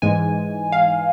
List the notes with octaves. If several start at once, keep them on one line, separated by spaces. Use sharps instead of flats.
G#2 E3 G#3 G#5
F5